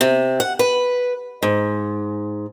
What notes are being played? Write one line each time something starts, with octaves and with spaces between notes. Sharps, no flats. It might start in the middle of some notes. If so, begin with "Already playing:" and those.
C3
F#5
B4
G#2